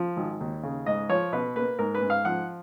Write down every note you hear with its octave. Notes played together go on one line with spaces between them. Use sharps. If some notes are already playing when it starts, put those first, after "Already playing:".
Already playing: F3
G#1
D#2
C#3
G#2 D#5
F3 C#5
B2 B4
A#3 B4
G#2 A#4
B4
G#2
F5
F3 F#5